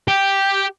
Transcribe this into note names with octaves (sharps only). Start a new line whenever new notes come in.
G4